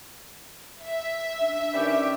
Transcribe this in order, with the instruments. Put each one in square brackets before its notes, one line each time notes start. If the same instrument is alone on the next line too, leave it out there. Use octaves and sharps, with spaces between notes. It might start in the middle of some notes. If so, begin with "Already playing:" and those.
[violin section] E5
[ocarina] D4
[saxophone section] D#3 B4 D5 [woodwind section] C#4 G4